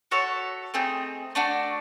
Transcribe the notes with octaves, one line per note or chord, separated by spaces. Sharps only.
F#4 A4 C#5 E5
A3 C4 D#4 G#4
A3 D4 F#4